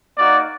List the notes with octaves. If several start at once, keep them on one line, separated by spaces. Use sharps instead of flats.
A#3 D#4 F#4 D5